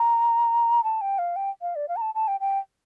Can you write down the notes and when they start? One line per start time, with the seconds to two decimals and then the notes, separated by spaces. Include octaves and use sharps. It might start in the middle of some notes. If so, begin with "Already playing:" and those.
Already playing: A#5
0.84 A5
1.01 G5
1.18 F5
1.36 G5
1.62 F5
1.76 D5
1.88 F5
1.96 A#5
2.01 A5
2.15 A5
2.28 G5
2.40 G5